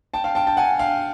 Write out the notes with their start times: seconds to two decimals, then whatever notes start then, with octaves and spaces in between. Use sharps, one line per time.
0.14 G5 A5
0.24 F5 G5
0.35 G5 A5
0.47 G5 A5
0.57 F#5 G#5
0.79 F5 G5